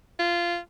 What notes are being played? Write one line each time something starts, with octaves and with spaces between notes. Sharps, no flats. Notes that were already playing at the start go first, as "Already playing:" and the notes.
F4